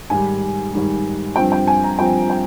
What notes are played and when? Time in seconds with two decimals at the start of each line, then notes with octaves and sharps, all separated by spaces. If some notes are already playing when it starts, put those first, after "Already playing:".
0.10 G#2 D#3 G3 G#5
0.73 G#2 D#3 G3
1.36 G2 F3 C4 G5
1.52 G5
1.67 G#5
1.83 A#5
1.99 G2 F3 C4 G5
2.30 G5